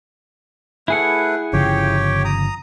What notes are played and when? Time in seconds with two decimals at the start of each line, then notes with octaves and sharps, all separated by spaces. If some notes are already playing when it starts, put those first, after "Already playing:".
0.88 A3 E4 G#4 B4 F#5
1.53 G1 C#3 F3 G4 C#5 G5
2.25 A#5 D#6